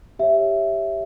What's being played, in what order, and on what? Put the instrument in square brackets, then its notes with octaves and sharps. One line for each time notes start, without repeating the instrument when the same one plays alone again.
[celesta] G4 C#5 E5